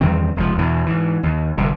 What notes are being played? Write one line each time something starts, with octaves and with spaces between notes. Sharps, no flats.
E2 G2 D#3 C4
F1 C#2 B2 F3
E2 B2 E3
G#2 E3
D#2
G1 C2 G2 C3